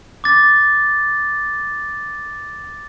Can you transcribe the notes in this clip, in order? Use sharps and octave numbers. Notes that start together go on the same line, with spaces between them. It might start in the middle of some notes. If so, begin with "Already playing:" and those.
D6 A6